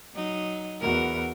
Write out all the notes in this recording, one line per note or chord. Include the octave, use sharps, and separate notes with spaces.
F#3 D#4
E2 F#4 A#4